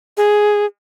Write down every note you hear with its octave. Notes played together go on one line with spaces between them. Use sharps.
G#4